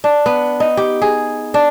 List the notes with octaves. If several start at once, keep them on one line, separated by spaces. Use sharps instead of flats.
D4
B3
D#4
G4
G#4
D4